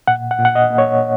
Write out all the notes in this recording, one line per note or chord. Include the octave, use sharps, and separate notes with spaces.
A#2 F#5
F#5
A#2
F#5
D#5
A#3
C#5